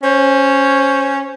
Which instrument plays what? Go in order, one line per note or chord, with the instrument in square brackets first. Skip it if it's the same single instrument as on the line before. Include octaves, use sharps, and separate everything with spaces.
[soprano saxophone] C#4 [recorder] C5